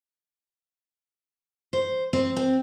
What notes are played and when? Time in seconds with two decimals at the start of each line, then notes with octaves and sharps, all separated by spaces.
1.73 C5
2.13 C4
2.36 C4